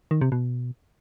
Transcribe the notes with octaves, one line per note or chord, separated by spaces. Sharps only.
D#3
C3
B2